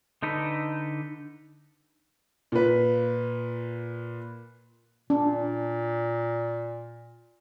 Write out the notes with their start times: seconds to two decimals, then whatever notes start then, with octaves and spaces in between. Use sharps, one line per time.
0.22 D3 D#4 A4 B4
2.52 A#2 B4
5.10 A#2 D4